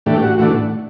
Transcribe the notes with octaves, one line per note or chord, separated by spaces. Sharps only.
A2 E3 A3 D4 G4
F#4
A2 E3 A3 D4 F#4